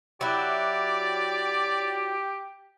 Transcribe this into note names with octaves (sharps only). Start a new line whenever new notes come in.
F#3 E4 G4 D5